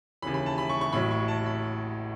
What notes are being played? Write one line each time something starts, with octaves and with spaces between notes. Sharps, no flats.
D#2 C#3 E3 B5
B5
A5
B5
C#6
C#6
A1 A2 F#3 B5
C#6
A5
B5